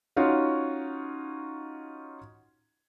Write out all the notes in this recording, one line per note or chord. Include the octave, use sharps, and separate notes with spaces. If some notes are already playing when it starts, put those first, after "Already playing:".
C#4 D#4 F4 F#4 C#5